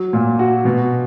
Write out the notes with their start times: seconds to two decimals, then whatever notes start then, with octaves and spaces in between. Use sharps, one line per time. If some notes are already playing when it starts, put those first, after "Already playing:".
Already playing: F#3
0.13 A#2
0.39 F#4
0.65 B2